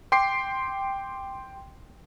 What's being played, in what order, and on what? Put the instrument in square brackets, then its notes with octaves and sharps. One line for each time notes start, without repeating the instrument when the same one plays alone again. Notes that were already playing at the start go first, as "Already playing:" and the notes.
[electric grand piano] G5 C6 D6 C7